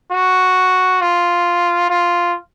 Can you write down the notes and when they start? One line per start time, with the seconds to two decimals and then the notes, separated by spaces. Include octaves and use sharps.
0.12 F#4
1.01 F4
1.90 F4